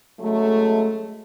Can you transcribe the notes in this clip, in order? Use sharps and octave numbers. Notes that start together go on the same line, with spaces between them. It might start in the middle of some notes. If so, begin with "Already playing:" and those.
C#3 F#3 G#3 A3